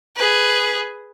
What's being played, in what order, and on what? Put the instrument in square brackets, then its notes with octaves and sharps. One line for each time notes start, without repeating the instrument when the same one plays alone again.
[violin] G#4 B4